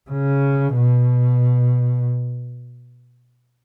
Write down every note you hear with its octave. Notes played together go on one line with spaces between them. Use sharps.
C#3
B2